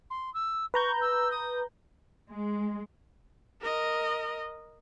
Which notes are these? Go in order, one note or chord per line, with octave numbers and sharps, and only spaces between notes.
C6
E6
B4 A#5 C#6 G6
E6
D#6
G#3
A#4 D#5